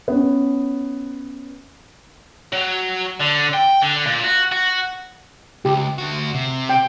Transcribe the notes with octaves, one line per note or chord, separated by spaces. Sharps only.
B3 C#4
F#3
D3
G5
D3
A#2
F#4
F#4
C#2 G4
D2 F#4
C3
G5